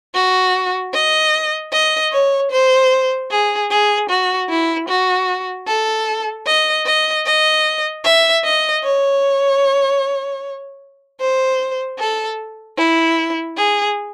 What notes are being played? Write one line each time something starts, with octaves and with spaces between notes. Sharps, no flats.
F#4
D#5
D#5
C#5
C5
G#4
G#4
F#4
E4
F#4
A4
D#5
D#5
D#5
E5
D#5
C#5
C5
A4
E4
G#4